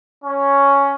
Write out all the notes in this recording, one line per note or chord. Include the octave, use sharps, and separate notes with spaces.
C#4